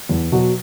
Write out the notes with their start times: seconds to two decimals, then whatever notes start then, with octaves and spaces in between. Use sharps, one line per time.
0.09 E2
0.32 B2 F#3